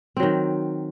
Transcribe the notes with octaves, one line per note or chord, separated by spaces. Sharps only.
D#3 F#3 C4